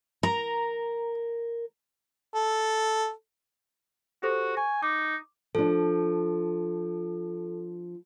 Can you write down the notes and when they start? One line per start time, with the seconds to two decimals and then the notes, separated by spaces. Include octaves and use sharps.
0.23 A#4 A#5
2.35 A4
4.23 F#4 G4 A4 C5
4.57 G#5 C#6
4.83 D#4 D6
5.55 F3 D4 A4